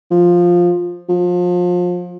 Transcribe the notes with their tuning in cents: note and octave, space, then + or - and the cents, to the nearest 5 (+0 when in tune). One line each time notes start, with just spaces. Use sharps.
F3 +5
F3 +30